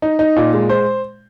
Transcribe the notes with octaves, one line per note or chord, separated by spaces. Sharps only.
D#4
D#4
A#2
G#3
C5